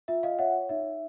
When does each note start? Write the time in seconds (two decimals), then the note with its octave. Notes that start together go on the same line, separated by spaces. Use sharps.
0.08 F4 E5
0.23 D#5 F5
0.39 C#5 E5 F#5
0.69 D#4 E5